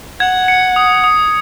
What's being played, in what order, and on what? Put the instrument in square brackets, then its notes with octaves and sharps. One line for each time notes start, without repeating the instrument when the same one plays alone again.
[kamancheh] F#5 [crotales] G#6
[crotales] C#7
D#6
D#6